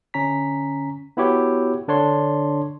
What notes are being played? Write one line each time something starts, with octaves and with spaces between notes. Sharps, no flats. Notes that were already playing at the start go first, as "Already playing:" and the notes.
D3 C#4 A#5 B6
B3 E4 F#4 G4 C#5
D3 D4 C#5 C6